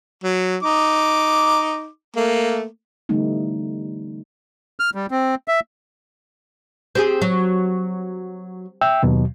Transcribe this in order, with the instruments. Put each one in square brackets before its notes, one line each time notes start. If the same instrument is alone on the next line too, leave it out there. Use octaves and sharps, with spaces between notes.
[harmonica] F#3
D#4 D6
A3 A#3
[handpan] D3 E3 G3 A3 B3 D#4
[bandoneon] F6
G3
C4
E5
[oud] C4 G4 G#4
F#3
[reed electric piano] E5 G5 E6
D#2 B2 F#3